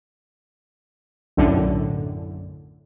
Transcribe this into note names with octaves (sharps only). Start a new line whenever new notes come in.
B1 F#2 A2 D3